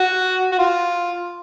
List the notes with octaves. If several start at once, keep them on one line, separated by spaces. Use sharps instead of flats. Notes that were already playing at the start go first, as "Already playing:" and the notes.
Already playing: F#4
F#4
F4